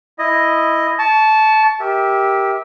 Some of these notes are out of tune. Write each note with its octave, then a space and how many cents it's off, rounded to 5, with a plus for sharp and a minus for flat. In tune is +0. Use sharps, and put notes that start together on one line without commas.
E4 +0 D#5 +0
A5 -15 C#6 +20
G4 +0 A#4 +10 E5 -25